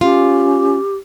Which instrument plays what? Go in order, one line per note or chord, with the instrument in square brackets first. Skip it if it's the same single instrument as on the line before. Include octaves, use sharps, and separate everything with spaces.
[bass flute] C#4 [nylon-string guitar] F4 [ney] G4